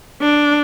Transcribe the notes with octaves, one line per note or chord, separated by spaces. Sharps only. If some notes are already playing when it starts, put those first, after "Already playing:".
D4